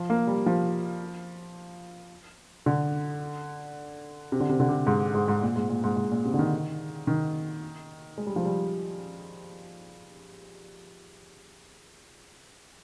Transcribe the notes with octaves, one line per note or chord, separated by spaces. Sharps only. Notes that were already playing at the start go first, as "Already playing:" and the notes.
Already playing: F3
A#3
G3
F3
D3
C3
D3
C3
D3
C3
G#2
G#2
G#2
A#2
G#2
A#2
G#2
G#2
A#2
C3
D3
D#3
D#3
G#3
G3
F3
G3